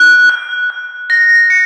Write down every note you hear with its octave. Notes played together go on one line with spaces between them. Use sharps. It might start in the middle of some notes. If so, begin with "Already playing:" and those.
Already playing: F#6
F#6
F#6
A#6
C#7